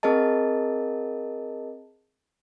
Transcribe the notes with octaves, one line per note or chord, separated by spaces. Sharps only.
C4 G#4 A#4 D#5 A5